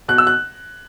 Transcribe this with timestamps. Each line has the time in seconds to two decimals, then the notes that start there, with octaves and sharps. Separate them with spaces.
0.08 B2 F#6
0.18 E6
0.27 F#6